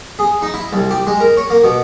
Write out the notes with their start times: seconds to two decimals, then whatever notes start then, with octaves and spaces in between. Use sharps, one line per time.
0.19 G#4
0.42 D#4
0.54 E4
0.73 C2
0.91 G4
1.07 G#3
1.20 A#4
1.37 C#5
1.50 A#3
1.64 B2